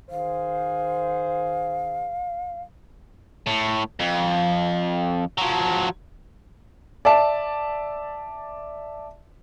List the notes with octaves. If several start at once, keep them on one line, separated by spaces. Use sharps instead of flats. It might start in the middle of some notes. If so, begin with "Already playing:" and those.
D#3 G#4 C5 F5
A2
F2
F3 F#3
D5 E5 A5